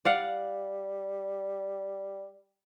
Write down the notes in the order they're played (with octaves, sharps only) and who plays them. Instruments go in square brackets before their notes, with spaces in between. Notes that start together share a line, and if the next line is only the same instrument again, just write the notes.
[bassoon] G3 [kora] D5 F5 F#5